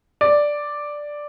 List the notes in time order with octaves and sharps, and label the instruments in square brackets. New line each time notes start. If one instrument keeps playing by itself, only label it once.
[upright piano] D5